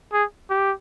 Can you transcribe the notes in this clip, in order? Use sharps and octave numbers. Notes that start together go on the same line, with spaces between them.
G#4
G4